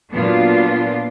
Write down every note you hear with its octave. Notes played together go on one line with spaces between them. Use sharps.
A#2 F#3 B3 D4 F4